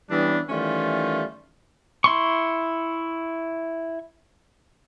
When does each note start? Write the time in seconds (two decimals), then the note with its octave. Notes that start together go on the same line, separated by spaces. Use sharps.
0.10 E3 G3 B3 C#4 D4
0.49 D#3 E3 G3 A3 C#4 F4
2.04 E4 C6 C#6